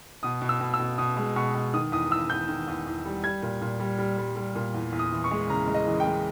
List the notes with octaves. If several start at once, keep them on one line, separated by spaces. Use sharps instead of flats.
B2 D#6
B2
E6
B2
E6
B2
B2 D#6
G#3
B2 C#6
B2
D#3 D#6
E2 D#6
E2 E6
E2 G6
D#3
E2
E2
G3
G3 G#6
A#2
A#2
G3
G3
G3
G3
A#2
E2
E2
D#6
E3
C#6
G#3
C#3 A#5
G#3
D#5
E3
G5
G#3